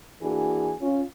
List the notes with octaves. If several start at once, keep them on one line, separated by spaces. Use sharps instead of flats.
E3 A#3 D4 F#4 G#4
C#4 F4